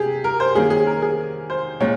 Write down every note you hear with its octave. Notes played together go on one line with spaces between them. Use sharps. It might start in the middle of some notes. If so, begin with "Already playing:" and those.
Already playing: C3 G4 G#4
A#4
C5
D#3 A#3 C#4 G#4
G#4
A#4
G#4
C5
A#2 G#3 C#4 C#5